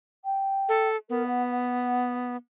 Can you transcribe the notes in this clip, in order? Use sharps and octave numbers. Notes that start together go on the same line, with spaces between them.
G5
A4
B3 A#4
F#5
F#5